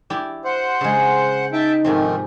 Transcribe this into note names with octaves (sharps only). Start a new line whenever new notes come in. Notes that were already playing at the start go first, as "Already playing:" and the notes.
E4 G4 D5
C5 F#5
C#3 G#3
D#4 E5 G5 A5
G#2 C3 D#3 F3 A3 C4